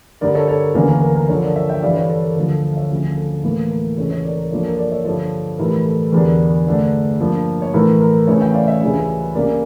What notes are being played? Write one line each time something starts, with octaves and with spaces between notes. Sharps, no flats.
G2 D3 G3 A#4 D5
A4 C#5
A4 C#5
A#4
D2 C#3 E3 A#3 C#4 A#4
A#4
A#4
A#4
G2 D3 F3 A4 C#5
A#4 D5
C#5 E5
E5 G5
G2 E3 G3 D4 D5 F5
A4 C#5
A4 C#5
A#4
D2 D3 F3
A4
F5
C#5 E5
D2 C#3 F3
A4
A2 E3 A#3 A4
A#4
C#2 C#3 E3 A4 C#5
A4 C#5
A#4 D5
A#4
G2 F3 A#3 D4 A4 C#5
A#4
A#4 D5
C#5 E5
G2 D3 F3 A4 C#5
A2 E3 G3 A#4
A4
E2 D3 G3 D4 A#4
G2 D3 A3 D4
G2 F3 A#3
C#5
A2 E3 A3 A#4
A#4
C#3 E3 A3 C#4 C#5 E5
E5 G5
D5 F5
C#5 E5
C#2 C#3 E3 G3 C#4
C#3 G3 A#3 C#4 A#4 D5